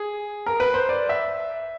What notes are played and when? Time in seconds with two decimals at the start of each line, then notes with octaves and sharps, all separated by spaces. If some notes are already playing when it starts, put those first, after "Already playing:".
Already playing: G#4
0.46 A#4
0.60 B4
0.74 C5
0.89 D5
1.09 E5